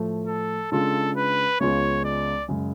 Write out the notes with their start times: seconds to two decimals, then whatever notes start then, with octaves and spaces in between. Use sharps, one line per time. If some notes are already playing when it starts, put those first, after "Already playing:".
Already playing: A2 F3 A3
0.27 A4
0.72 C#3 G#3 D4 F4 A4
1.17 B4
1.60 C#2 C#3 G#3 B3 F4 C#5
2.05 D5
2.48 F#2 C#3 G#3